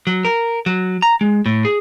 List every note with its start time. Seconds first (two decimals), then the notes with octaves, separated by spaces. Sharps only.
0.07 F#3
0.25 A#4
0.66 F#3
1.02 A#5
1.21 G#3
1.46 A2
1.65 G#4